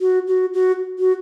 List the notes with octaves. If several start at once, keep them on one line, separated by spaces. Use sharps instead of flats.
F#4
F#4
F#4
F#4